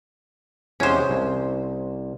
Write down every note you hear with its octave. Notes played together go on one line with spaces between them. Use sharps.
E2 C3 G#3 C#4 C5
C2